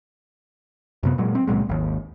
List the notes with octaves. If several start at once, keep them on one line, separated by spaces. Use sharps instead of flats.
F#2 C3 B3
A#2 F#3 G#3
C4
C#2 A#2 F#3 G#3
G#1 D#2